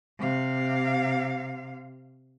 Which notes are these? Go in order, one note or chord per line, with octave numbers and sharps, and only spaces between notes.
C3 F5